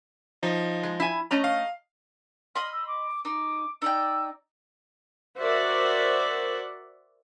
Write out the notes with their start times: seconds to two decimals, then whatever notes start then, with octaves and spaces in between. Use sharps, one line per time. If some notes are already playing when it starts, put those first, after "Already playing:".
0.43 F3 D#4
0.83 G#3
1.00 E4 G#5
1.31 A3 C#4 D#5 A#5
1.44 F5
2.55 D#5 B5 C6 F6
2.72 E6
2.87 D6
3.25 D#4 D6
3.82 D#4 D5 G5 E6
5.39 F#4 A#4 C5 D5 E5 F#5